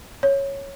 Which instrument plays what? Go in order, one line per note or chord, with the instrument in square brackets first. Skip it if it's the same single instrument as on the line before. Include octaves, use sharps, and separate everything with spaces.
[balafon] C#5